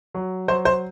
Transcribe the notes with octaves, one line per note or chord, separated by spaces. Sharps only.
F#3
F#3 C5
C5